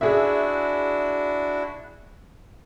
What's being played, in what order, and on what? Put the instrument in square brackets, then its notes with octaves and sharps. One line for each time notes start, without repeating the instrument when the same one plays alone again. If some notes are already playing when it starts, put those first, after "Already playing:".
[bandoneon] D4 E4 F#4 [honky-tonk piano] G#4 E5